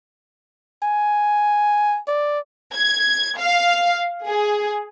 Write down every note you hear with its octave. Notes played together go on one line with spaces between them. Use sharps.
G#5
D5
G#6
F5
G#4